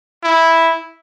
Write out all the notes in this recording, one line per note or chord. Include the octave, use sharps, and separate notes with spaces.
E4